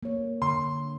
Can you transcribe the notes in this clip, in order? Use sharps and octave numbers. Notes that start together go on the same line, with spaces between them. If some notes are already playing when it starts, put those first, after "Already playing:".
A#3 C#5
D3 C6